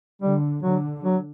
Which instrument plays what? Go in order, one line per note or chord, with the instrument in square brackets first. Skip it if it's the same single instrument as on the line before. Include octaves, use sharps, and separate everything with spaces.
[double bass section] D3 [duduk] G3
[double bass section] D3 [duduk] F#3
[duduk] F#3